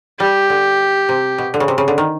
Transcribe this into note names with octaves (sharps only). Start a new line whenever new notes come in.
G3 G4
D3
C3
B2
D3
C#3
C3
C#3
D3
D#3